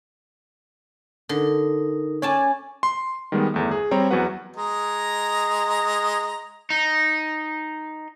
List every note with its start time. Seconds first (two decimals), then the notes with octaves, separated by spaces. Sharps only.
1.29 D3 D#4 A#4
2.22 C#4 C#5 D5 G#5 A5
2.83 C6
3.32 D#3 G3 G#3 B3
3.54 G1 E2 A3
3.71 G#4
3.91 G3 C4 C5 C#5 A#5
4.11 E2 F#3 F#4 B4 F#5
4.56 G#3 D#5 A#5
6.70 D#4